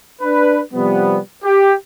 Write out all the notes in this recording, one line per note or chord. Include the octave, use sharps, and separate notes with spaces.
D4 B4
C3 F3 G3 B3
G4